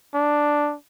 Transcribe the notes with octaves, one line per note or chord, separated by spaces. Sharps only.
D4